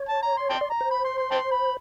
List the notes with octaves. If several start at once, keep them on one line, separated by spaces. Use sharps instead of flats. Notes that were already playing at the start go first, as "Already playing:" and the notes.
Already playing: C#5
A5
A#5
C6
D5 G5 A5 C6
D5
A#5
C5
B5
C6
C6
G5 A5 C6
B5